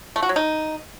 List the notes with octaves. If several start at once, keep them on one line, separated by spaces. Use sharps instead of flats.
A3
F#4
F#3
D#4